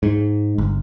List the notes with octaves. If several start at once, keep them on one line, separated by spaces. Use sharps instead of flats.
G#2
G1